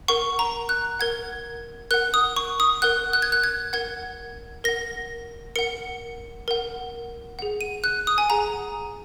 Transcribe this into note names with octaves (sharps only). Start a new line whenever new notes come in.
A#4 F#5 C#6
A#5
F#6
A#4 F#5 G#6
A#4 F#5 F#6
D#6
C#6
D#6
A#4 F#5 F#6
F#6
G#6
F#6
G#6
A#4 F#5 G#6
A#4 F#5 A#6
A#4 F#5 C#7
A#4 F#5
G#4 F#5
D#7
F#6
D#6
G#5
G#4 F#5 A#5